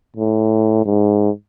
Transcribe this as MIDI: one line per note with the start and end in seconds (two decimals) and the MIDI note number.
0.16 0.84 45
0.85 1.30 44